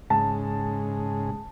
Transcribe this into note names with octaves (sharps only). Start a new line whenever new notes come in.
G#2 C#3 G#3 A5